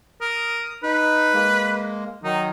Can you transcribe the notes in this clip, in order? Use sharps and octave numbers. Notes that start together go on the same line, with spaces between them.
A#4 D#6
D#4 B4
G#3 A#3
D#3 F#3 D#4